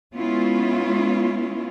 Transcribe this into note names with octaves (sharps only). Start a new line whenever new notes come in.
G#3 B3 C#4 E4 F4